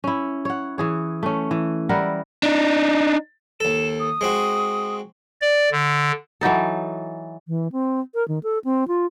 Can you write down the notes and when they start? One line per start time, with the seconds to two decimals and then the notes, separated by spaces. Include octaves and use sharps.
0.04 C#4 E4
0.45 C#5 F#5
0.78 E3 G#4 C#5
1.23 A3 C#4
1.51 E3
1.89 G3 E4 A#4 F#5
2.43 D4 D#4
3.60 D#2 A4 E7
4.00 D#6
4.21 G#3 C4 F#4
5.41 D5
5.72 D3
6.41 E3 F#3 D#4 A4
7.48 E3
7.72 C4
8.14 A#4
8.28 D#3
8.43 A4
8.64 C4
8.88 F4